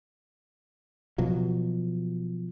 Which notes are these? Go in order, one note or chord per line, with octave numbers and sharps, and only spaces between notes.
B2 F3 F#3